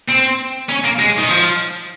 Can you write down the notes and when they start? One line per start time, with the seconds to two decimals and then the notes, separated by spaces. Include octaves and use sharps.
0.08 C4
0.69 C#4
0.84 A#3
0.99 G#3
1.18 D#3
1.29 F3